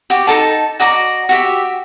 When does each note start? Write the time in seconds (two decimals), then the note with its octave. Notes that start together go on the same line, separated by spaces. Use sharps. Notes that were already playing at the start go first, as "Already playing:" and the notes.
0.10 F#4 G4
0.27 D#4 A4 A5
0.79 F#4 D5 D#5 A#5
1.29 F#4 G4 E5